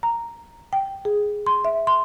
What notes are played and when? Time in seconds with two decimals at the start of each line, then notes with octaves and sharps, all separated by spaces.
0.03 A#5
0.73 G5
1.05 G#4
1.47 C6
1.65 E5
1.87 C6